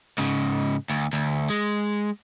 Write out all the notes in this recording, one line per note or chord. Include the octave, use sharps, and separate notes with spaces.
G#2 C#3
D2
D2
G#3